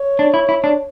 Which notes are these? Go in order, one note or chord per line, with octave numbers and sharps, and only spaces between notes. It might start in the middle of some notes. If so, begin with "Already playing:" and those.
Already playing: C#5
D4
E4
E4
D4